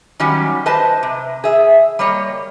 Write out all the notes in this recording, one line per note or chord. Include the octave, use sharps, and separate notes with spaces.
D#3 F#3 G3 C#4
B4 C5 D#5 A5
C3
G#4 E5
G3 A#3 C#5 D#5